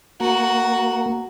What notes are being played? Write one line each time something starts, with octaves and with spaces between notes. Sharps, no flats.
A#3 F#4